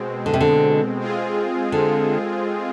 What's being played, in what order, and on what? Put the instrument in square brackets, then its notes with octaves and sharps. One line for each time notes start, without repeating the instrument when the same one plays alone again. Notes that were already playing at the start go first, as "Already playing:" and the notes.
Already playing: [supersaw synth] B2 G#3 C4
[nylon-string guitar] D3
C3
D3
[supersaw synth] G#3 C4 F4 G#4
[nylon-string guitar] D3